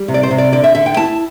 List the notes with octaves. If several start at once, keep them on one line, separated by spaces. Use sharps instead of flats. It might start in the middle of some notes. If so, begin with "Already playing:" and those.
Already playing: G3
C3
D5
C5
C3
D5
D3 D5
E5
D3 E5
G5
E4 A5